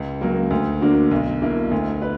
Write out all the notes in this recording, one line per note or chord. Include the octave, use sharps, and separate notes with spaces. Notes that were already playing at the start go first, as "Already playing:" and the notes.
Already playing: C#2
C#3 F#3 A#3
D2
D3 A#3 D4 F#4
B1
B2 A#3 E4
D2
B4